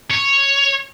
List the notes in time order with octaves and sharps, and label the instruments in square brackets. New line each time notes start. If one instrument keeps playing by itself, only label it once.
[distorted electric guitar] C#5